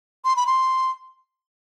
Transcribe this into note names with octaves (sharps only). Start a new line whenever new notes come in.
C6
B5
C6